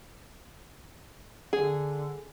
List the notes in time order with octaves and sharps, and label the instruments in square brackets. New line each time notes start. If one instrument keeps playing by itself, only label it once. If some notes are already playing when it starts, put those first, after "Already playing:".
[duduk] D3 [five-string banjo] G#4